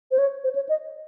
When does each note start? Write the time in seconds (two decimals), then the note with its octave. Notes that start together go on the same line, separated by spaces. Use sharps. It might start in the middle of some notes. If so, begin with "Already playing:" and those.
0.11 C5
0.18 C#5
0.44 C5
0.55 C#5
0.69 D#5